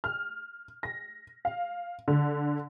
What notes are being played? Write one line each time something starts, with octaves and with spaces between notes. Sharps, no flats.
F6
A#6
F5
D3